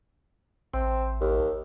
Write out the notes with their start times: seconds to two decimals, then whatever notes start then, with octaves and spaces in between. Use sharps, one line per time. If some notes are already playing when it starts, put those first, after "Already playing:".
0.74 A1 C4
1.21 D#2